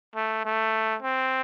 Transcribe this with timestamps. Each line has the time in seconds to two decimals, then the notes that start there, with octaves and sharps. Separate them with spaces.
0.16 A3
0.45 A3
1.02 C4